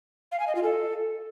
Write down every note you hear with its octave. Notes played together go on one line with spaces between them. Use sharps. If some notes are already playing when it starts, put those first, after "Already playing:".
F5
G#5
D#5
F4
A4